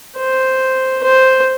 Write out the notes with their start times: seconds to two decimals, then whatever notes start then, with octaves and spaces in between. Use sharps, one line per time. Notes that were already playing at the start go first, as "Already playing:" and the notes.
0.17 C5
1.03 C5